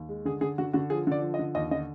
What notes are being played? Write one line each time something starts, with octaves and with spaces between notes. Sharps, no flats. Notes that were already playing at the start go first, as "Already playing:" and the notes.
Already playing: D#2
G#3
D3 G#4
D3 G#4
D3 F#4
D3 F#4
F3 G#4
D3 D5
F3
D#5
D3
D#2 D#5
D3 D#5